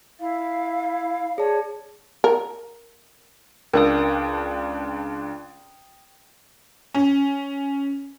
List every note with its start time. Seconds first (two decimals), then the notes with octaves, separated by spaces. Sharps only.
0.20 E4 F5
1.38 G#4 C#5 D5 A5
2.24 A#4
3.74 C#2 D4 A#4 F5 G5 D#6
6.94 C#4